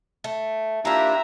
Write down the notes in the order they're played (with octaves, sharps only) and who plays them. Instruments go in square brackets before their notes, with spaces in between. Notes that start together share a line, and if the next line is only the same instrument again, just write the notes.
[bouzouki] A3
[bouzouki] A#3 F4 [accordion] D4 E4 G4 [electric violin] E5 A#5